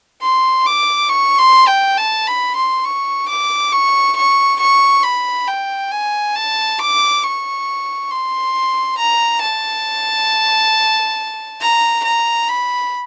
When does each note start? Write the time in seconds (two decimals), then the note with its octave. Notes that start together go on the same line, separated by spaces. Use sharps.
0.22 C6
0.66 D6
1.09 C#6
1.38 C6
1.67 G5
1.98 A5
2.27 B5
2.56 C6
2.85 C#6
3.29 D6
3.72 C#6
4.17 C#6
4.60 C#6
5.03 B5
5.47 G5
5.91 G#5
6.35 A5
6.79 D6
7.23 C#6
8.11 C6
8.98 A#5
9.41 A5
11.61 A#5
12.04 A#5
12.48 B5